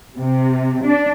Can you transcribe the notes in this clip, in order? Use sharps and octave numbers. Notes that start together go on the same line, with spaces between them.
C3
D4